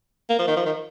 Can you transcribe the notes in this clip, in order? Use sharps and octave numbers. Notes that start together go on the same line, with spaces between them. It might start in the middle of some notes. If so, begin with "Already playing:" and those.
A#3
F3
D#3
F3
D#3